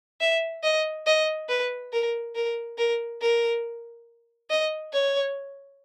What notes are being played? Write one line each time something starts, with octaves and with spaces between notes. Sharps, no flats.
E5
D#5
D#5
B4
A#4
A#4
A#4
A#4
D#5
C#5